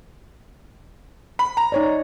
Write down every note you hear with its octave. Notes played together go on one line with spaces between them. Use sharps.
B5
A#5
D#4 C#5 D5